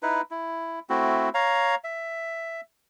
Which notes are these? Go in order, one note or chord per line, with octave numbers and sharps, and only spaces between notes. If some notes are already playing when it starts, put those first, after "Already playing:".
D#4 E4 B4
E4
A3 C4 E4 F#4
C#5 F5 A#5
E5